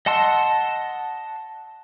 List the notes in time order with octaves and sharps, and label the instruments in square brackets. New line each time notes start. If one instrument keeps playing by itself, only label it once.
[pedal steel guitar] D#5 F#5 A5 C6 E6